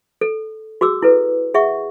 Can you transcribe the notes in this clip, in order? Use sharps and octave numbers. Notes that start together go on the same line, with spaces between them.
A4
F#4 G#4 D6 E6
E4 A4 B4
G#4 E5 F#5 C#6